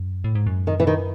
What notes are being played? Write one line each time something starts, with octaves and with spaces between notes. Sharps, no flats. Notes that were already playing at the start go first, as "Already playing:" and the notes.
Already playing: F#2
A2
G#2
F#2
D#3
E3
D#3